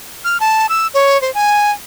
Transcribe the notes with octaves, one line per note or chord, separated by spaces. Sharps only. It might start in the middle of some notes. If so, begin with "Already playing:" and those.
F6
A5
E6
C#5
C5
G#5